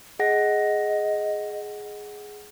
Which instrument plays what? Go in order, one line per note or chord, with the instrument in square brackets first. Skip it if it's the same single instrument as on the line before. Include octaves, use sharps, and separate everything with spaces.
[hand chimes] G#4 F#5 A#6 [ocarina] D#5